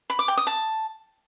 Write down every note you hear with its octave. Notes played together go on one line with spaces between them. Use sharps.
B5
D6
G5
D#6
A5